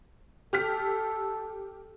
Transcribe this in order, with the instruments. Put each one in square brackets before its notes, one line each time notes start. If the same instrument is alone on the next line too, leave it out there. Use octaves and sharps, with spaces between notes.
[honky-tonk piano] G4 F6 B6 [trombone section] A4